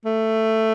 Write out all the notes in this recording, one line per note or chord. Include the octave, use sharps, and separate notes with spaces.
A3